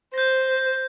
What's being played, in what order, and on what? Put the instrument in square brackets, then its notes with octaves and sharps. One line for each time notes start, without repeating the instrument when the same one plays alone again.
[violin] C5 [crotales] G6 A#6